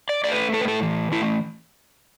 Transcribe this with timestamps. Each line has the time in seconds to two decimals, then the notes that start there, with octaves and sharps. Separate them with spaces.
0.09 D5
0.24 A3 D5
0.31 B4
0.53 A2 A4
0.61 B4
0.68 A4
0.82 E3
1.12 A3 E4